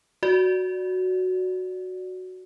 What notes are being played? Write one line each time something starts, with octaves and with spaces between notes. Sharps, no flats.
F#4 D5